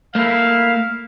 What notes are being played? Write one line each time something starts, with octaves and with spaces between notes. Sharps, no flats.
A3 A#3 E4 F5